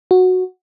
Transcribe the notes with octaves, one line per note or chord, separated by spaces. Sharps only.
F#4